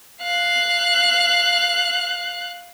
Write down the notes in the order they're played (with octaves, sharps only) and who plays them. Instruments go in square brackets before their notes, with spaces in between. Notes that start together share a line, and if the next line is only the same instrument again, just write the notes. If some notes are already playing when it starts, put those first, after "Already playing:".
[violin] F5 F#6